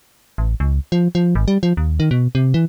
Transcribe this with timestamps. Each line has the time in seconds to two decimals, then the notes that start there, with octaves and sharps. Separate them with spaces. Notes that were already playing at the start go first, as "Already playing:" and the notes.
0.38 A1
0.60 C#2
0.92 F3
1.15 F3
1.35 G#1
1.48 G3
1.63 F3
1.77 D#2
2.00 D#3
2.11 B2
2.35 C3
2.54 E3